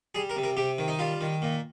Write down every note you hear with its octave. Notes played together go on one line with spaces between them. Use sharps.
G3 G#4
A#4
C3
A#4
C3 G4
D#3
D#4
G3 F4
D#3
A#2